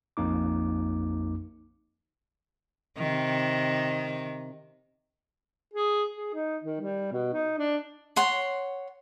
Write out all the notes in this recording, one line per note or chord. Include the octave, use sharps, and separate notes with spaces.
A#1 F2 A#3 D#4 D6
C3 D#3
G#4
G#4
D#4
D#3
G3
B2
D#4
D4
C#5 F#5 C6